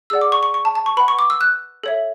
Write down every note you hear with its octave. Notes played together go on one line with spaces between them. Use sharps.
G#4 D5 F#5 E6
D6
C#6
C#6
C#6
A5
A5
C#6
B4 F#5 B5
C#6
D6
E6
F#6
A4 C#5 E5